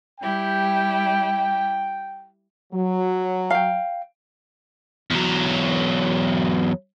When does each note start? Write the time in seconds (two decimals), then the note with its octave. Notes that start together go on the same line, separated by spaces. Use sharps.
0.20 G3 E4 G4 G5
2.73 F#3
3.50 F5 G5
5.10 E2 F#3